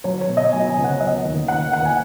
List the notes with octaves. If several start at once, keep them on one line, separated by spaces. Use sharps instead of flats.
F#3 C#5
C#5
B2
D#5
F#3 G#5
G#5
C#2
F#5
F#3 D#5
D#2
D#3 F#5
D#2 F#5
G#5